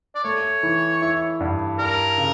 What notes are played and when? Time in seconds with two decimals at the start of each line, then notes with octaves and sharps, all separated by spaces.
0.15 D5
0.24 A3 C#5
0.63 E3
1.02 E4
1.40 G2
1.79 G3 A#4
2.18 C#3